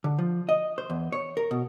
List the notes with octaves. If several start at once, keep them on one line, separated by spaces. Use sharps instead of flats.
D3
F3
D#5
C5
E2
C#5
A#4
B2